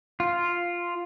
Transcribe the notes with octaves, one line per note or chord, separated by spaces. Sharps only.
F4